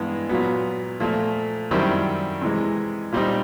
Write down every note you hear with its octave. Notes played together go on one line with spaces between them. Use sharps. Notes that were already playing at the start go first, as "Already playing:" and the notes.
Already playing: G2 E3 G#3 B3
A#2 F#3 B3
A#2 F3 A3
F#2 D#3 G3 C4 E4
C3 E3 G#3
A#2 G3 C4 D#4